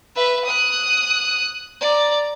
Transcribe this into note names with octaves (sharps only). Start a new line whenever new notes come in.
B4 E5
D#6 F#6
D5 A#5